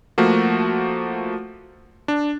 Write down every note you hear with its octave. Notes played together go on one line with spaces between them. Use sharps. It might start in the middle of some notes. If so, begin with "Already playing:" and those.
F3 A3 A#3 F#4
D4